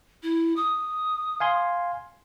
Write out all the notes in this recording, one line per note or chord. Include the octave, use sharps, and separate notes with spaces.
E4
D#6
F5 G#5 C6